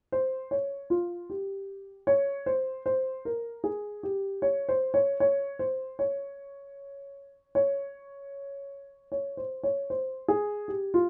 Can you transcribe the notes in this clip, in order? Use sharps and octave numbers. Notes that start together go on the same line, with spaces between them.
C5
C#5
F4
G4
C#5
C5
C5
A#4
G#4
G4
C#5
C5
C#5
C#5
C5
C#5
C#5
C#5
C5
C#5
C5
G#4
G4
F4